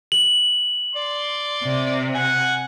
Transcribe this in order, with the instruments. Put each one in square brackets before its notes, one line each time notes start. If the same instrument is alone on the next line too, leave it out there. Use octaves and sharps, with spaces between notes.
[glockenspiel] F#7
[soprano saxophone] D5 [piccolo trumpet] C6
[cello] C3
[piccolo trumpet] F#5 [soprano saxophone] G#5